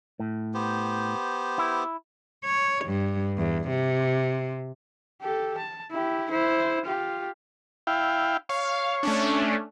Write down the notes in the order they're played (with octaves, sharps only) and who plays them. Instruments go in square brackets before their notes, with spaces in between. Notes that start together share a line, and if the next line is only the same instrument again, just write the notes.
[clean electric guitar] A2
[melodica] B3 G4 C5
[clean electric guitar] E4
[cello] C#5
G2
E2
C3
[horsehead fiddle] G4 A4
A5
E4 G4
E4 C5
F4 G4
[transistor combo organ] E4 F5 G5
[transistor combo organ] C#5 [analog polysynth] F5
[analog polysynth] A3 C#4 D4